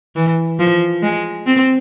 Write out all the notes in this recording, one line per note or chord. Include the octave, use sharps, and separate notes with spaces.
E3
F3
G#3
C4